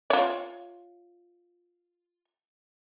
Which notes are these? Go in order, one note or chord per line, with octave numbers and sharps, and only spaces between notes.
F4 C#5